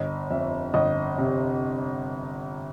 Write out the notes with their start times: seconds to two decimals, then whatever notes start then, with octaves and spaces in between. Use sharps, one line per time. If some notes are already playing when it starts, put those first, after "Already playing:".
Already playing: G1 D#5
0.31 F2 E5
0.74 G1 D#5
1.18 C3